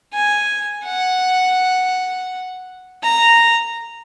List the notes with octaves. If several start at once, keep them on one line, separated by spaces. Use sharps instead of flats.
G#5
F#5
A#5